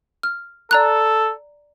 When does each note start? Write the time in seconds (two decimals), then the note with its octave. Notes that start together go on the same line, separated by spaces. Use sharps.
0.23 F6
0.71 A4 D5 A#5 F#6